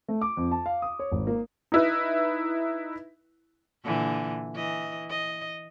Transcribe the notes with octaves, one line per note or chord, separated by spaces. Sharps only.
A3
D6
F2
A5
F5
D#6
C#5
G#1
A#3
D#4 E4 B4
A#2 D3 E3
E3 D#5
D#5